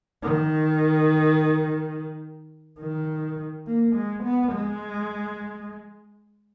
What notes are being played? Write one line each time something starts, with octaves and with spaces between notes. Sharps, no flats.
D#3
D#3
A#3
G#3
B3
G#3